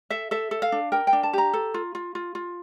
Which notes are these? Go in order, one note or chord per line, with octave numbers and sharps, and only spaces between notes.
A4 E5
A4 E5
A4
F5
D4
A#4 G5
G5
D4
A5
G4 A#5
A4
F4
F4
F4
F4